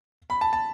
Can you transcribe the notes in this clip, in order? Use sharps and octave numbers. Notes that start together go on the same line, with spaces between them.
B5
A5
A5